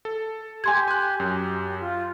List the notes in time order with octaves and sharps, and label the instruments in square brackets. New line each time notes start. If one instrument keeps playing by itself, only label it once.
[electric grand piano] A4
[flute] G4 [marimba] G#5 C6 G#6
[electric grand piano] G#5 F#6 [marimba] C6
[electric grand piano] F#2 [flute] G4
[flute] F4